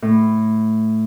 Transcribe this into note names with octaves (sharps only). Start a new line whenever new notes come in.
A2